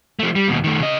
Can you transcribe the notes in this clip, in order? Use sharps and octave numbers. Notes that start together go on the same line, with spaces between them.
F3 A3
G3
D#2 B2
D#3 A3
C#3 D#5